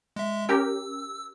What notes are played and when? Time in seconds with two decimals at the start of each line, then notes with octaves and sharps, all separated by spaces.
0.16 G#3 E5
0.49 C#4 G4 A#4 E6